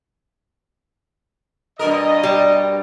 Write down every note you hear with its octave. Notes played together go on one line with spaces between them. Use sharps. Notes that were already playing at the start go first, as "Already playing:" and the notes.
G2 B2 A#4 D#5
G3